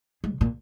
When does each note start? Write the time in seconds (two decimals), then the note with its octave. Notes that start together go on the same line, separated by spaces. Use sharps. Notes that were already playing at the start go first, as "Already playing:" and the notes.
0.24 G#3
0.32 B2
0.41 A#2